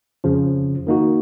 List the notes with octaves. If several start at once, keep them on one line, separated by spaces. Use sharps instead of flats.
F2 C#3 F3
D#3 A#3 D#4 F#4